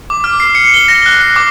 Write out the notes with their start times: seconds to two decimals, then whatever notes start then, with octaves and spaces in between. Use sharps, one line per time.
0.10 D6
0.24 F6
0.40 C7
0.55 C#7
0.74 G7
0.88 A#6
1.06 F#6
1.21 C7
1.36 D6